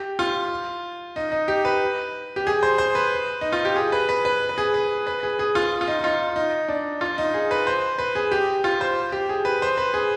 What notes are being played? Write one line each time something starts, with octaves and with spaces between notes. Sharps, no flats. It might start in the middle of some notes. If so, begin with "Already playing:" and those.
Already playing: G4
F4
D#4
D#4
G4
B4
G4
G#4
C5
C5
B4
D#4
F4
G4
G#4
B4
B4
B4
B4
G#4
B4
B4
G#4
G#4
F4
F4
D#4
D#4
F4
D#4
D4
F4
D#4
G#4
B4
C5
B4
G#4
G4
F4
C5
G4
G#4
B4
C5
B4
G#4